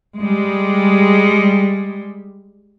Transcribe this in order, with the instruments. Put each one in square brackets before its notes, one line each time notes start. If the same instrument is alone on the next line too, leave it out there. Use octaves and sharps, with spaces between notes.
[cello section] G3 G#3